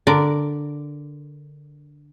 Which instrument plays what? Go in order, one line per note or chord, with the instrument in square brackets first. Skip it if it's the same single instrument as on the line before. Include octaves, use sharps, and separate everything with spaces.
[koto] D3 A#4 D5